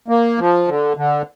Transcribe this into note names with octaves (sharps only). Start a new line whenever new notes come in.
A#3
F3
D3
D3